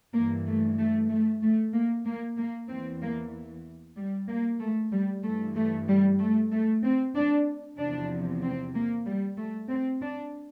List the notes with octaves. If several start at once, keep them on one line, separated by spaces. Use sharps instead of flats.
G2 E3 A#3
A3
A3
A3
A3
A#3
A#3
A#3
E2 E3 C4
A#3
G3
A#3
A3
G3
G2 E3 A3
A3
G3
A3
A3
C4
D4
E2 C3 F3 D4
C4
A#3
G3
A3
C4
D4